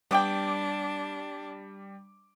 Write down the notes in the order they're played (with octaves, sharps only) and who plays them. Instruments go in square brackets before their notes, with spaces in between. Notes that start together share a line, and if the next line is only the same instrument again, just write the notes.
[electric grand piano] G3 D6 [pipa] B3 G4 G5 [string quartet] D4